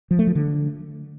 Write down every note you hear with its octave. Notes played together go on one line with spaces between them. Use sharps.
F3
A3
F3
D3